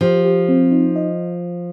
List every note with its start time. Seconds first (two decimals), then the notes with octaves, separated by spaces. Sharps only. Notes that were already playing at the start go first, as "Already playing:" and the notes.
0.01 F3 G4
0.24 G4
0.49 C4
0.71 D#4
0.96 D#5